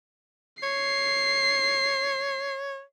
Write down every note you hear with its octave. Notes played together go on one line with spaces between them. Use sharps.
C#5 C7